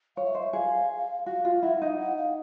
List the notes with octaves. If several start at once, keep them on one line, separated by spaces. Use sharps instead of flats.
C#5 F5
E5
C5 D#5
E5
G#4 F5
F#4 F5
F4
E4 F#5
D#4 F5
F#5
F5